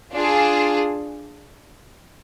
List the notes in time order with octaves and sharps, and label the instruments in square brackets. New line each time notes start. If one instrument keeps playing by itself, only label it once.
[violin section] D4 F4 G#4